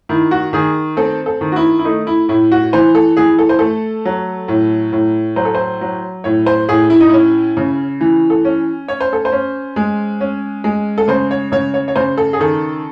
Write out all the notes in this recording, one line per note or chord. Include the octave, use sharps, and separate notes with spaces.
D#3 E4
F#4
D#3 G#4
C4 A4
A4
D#3
F#4
E4
E4
A3 D#4
E4
A2 E4
F#4
E3 C5
A4
E3 G#4
A4
C5
A3 A4
F#3
A2
A2
F#3 C5
A4
C5
F#3
A2 C#5
C5
A2 G#4
E4
D#4
C#4 E4
C#3
E3
A4
C#4
C#4 C#5
C5
A4
C5
C#4
G#3
C#4
G#3
A4
C#3 C5
C#5
C#3 C#5
C#5
C#5
C#3 C5
A4
G#4
D#3 A4